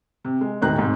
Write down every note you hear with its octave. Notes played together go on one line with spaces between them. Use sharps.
C3
G#3
E1 A2 D#3 D#5 A#5 F#6
D#2 G#2 C3